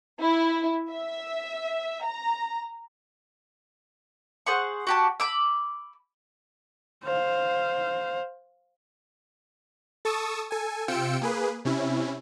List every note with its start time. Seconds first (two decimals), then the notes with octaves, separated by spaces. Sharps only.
0.19 E4
0.91 E5
2.04 A#5
4.46 G#4 C5 F#5 C#6
4.87 F#4 G4 A5
5.20 B5 D6 E6
7.04 C5 F5
10.05 A4 A5 C#6 D#6 E6
10.51 A4 G#5
10.88 C3 F4 G5 E6 C#7 D7
11.21 A#3 G#4 B4
11.65 C3 C#4 E4